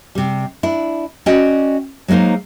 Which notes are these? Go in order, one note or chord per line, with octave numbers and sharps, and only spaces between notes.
C3 G3
D4 E4
C#4 F#4 D5 D#5 G5
F#3 G#3 A#3 D#4 C5